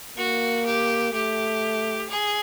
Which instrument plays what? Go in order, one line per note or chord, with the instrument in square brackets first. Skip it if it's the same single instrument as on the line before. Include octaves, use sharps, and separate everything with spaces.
[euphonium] A#3 [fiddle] F#4
[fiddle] G4
[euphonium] A3 [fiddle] G4
[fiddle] G#4